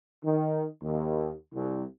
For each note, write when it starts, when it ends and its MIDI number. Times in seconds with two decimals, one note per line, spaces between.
0.23 0.64 51
0.82 1.32 39
1.52 1.83 36